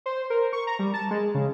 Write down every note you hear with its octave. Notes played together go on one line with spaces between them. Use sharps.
C5
A#4
C#6
A#5
G3
A5
G#3
C#3